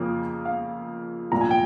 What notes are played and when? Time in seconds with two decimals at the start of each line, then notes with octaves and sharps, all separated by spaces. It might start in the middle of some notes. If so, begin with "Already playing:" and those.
Already playing: F2 C#3 F3 A#3 C#4
0.45 F5
1.31 C2 A#2 F3 A#5
1.41 G#5
1.51 G5